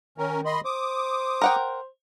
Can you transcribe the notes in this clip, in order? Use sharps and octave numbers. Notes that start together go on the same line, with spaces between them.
D#3 C#4 A#4
D#5 B5 C6
C5 D6 D#6
A#4 F#5 G5